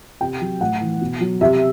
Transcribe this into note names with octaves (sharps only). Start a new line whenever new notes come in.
C3 G5
F#3
A2 F#5
E3
B2
F#3
C3 E5